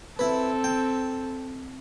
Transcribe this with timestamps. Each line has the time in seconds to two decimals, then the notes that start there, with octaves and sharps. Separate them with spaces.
0.19 C4 E4 A4 B4
0.64 G5